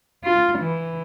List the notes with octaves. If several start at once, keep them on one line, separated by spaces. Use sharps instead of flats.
F4
E3